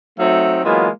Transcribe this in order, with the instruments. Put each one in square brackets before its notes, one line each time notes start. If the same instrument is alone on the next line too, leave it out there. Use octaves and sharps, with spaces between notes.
[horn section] F#3 A3 C4 D#4 E5
E3 F#3 G#3 A#3 B3 F4